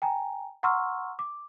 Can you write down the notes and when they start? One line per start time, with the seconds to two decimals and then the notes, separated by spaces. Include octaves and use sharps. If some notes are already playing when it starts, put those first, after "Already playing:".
0.02 G5 G#5 A#5
0.63 F#5 A#5 C6 C#6 E6 F6
1.19 D6